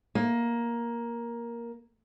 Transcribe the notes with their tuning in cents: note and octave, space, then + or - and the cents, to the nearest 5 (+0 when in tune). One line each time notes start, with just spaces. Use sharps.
A#3 +10